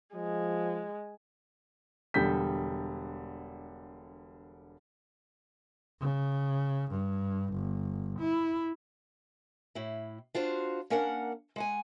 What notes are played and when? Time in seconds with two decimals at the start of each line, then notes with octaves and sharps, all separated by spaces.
0.15 F3 G#3
2.14 E1 D3 G3 G6 B6
6.01 C#3
6.91 G2
7.53 G1
8.19 E4
9.75 A2 E4
10.34 D4 F4 F#4 C5
10.90 A#3 C#4 D4 A#4 D5 F#5
11.56 G#3 F#5 G#5